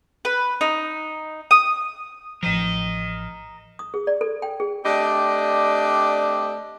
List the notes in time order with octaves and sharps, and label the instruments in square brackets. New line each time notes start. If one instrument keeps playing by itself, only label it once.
[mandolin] B4
D#4
D#6
[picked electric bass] A1 F3 [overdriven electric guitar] A#4 D#5
[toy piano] D#6
G#4
D5
A4
G5
G#4
[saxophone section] A3 C4 D4 G4 D5 D#5